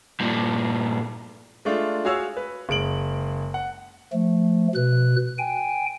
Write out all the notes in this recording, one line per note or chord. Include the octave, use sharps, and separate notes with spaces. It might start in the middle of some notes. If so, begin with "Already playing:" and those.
G2 A#2
G#3 A3 D4 F4
F#4 G#4 C#5 F5 E6
B4
F#1 G#3 D7 F#7
F#5
F3 A3
B2 B4 F#6
G5 G#5